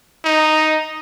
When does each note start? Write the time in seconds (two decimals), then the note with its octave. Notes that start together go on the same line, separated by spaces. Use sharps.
0.25 D#4